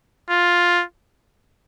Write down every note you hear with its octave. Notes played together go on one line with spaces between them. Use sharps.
F4